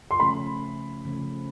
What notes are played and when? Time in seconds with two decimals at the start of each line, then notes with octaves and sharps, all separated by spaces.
0.11 C6
0.20 C#3 F3 A3 C#4 B5
1.05 C#3 F3 A3 C#4